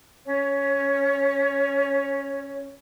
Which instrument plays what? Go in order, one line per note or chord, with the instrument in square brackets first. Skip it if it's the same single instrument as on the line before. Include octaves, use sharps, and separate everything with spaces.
[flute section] C#4 C#5